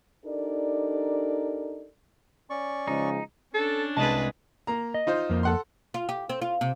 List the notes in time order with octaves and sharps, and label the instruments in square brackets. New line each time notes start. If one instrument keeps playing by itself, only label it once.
[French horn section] D4 D#4 G4 A4 A#4 D5
[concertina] C#4 D5 C#6
[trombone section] C#3 F3 G#3 [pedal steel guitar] D#4
[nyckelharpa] C#4 D4 [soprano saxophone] A4
[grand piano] C2 D#5 [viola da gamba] G#3 G#4 B4 [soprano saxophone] A5
[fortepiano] A#3 A#5
[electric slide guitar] D#5
[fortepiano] D#4 F4 C5
[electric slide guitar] F2 A#3
[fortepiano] A4 F#5 C6
[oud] F4
G4
C4
F4
C3